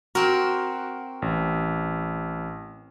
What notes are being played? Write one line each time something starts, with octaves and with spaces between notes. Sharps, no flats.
C4 F#4 A#4 F6
A1